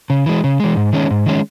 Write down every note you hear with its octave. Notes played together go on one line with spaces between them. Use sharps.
C#3
E3 G#3
C#3
E3 G#3
G#2
D#3 G#3 C#4
G#2
D#3 G#3 C#4